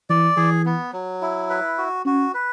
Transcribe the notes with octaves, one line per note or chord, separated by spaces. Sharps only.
E3 D5
E3 G#4
B3
F#3
E4
B4
F#4
C#4 F#4
B4